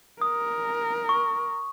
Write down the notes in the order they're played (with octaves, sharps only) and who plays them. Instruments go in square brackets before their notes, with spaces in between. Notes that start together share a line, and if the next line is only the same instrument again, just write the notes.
[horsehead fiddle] A#4 [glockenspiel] D#6
[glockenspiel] C#6